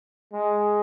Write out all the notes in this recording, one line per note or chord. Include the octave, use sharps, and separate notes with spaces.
G#3